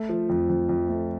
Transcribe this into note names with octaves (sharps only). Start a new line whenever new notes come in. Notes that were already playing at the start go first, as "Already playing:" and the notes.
Already playing: A3
F3
F2
F2
F2
A3